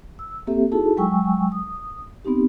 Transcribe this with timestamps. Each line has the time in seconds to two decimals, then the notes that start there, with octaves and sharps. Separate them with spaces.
0.19 E6
0.47 A#3 C4 G4 A4 E5
0.72 D#4 E4 F#4 G#4 A4 A5
0.97 F#3 G#3 G5 G#5 C#6 E6
1.52 D#6
2.25 B3 C4 D#4 G4